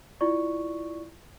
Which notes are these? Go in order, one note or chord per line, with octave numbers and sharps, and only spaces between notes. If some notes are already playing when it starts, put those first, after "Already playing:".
E4 F4 D5 C#6